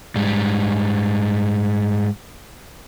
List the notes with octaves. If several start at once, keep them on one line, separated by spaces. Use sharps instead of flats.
G#2 G3